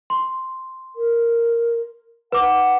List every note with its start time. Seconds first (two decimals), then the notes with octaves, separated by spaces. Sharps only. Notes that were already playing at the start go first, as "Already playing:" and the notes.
0.10 C6
0.96 A#4
2.32 B4 F#5 D6